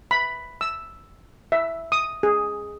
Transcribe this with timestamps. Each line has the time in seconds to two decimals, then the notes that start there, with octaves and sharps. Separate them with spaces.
0.11 B5
0.61 E6
1.52 E5
1.92 D#6
2.23 G#4